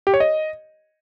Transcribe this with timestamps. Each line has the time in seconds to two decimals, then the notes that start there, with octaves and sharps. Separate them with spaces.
0.07 G4
0.14 C#5
0.20 D#5